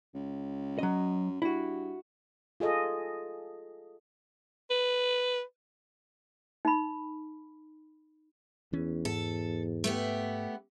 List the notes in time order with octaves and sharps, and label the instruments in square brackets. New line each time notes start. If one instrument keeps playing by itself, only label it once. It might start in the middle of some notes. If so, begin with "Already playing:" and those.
[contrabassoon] C#2
[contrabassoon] F#2 [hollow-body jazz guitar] F#3 D#5
[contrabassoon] G2 [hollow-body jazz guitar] E4 F#4
[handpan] F4 G#4 A4 D#5
[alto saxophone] B4
[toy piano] D#4 B5
[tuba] E2 [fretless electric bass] E3 C#4
[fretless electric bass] G#2 [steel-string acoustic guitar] A4
[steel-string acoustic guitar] A3 B3 G4